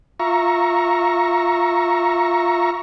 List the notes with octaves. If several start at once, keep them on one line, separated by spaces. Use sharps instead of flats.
F4 E5 A#5 C#6